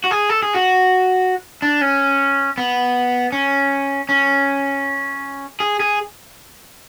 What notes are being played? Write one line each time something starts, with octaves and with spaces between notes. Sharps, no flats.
F#4
G#4
A4
G#4
F#4
D4
C#4
B3
C#4
C#4
G#4
G#4